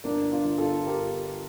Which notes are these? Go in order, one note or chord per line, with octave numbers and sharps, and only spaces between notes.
G1 A#3 D4
D4 F4
G1
F4 A4
G1 G4 A#4